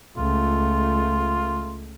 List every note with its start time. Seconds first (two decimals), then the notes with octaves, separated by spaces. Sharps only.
0.17 C#2 A3 F4